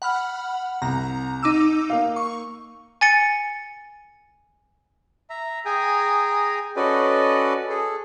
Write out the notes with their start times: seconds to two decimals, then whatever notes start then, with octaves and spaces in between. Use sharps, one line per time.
0.02 F#5 B5 F6
0.82 C2 A#5
1.43 D#4 D6 E6
1.90 A#3 F5
2.16 C#6
3.01 G#5 A6 C#7
5.30 E5 A#5
5.65 G#4 G5 G#5 A#5 D#6
6.77 C#4 F#4 A4 B4 D5 D#5
7.70 G#4 A4